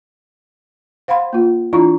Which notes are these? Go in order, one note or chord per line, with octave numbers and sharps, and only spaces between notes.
C5 F5 F#5 B5 C6
A#3 F4
E3 D4 E4 F4 A#5 C#6